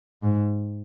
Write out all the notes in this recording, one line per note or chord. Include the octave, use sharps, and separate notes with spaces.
G#2